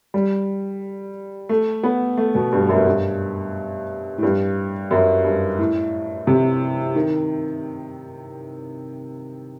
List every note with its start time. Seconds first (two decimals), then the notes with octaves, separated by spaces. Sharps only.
0.14 G3
1.49 A3
1.83 B3
2.17 A3
2.35 B2
2.52 G2
2.69 F#2
2.86 G2
4.18 A2
4.23 G2
4.91 F#2
5.24 G2
5.58 A2
6.27 C3
6.95 D#3